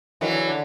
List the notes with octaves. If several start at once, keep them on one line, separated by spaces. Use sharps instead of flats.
D#3 E3 F#3
D3
C#3
D3